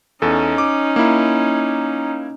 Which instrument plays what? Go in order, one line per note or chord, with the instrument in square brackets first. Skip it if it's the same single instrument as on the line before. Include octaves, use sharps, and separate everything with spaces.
[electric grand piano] E2 A4 [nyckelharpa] C#4 D#4
[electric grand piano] D6
A#3 E4